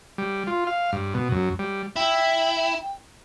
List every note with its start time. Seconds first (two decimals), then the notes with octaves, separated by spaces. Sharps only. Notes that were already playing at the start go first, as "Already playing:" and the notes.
0.18 G3
0.47 F4
0.67 F5
0.93 G2
1.14 B2
1.31 F#2
1.59 G3
1.96 E4 G5